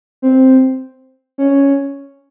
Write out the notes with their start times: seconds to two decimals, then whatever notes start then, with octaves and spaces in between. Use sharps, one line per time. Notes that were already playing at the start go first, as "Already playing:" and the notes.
0.22 C4
1.38 C#4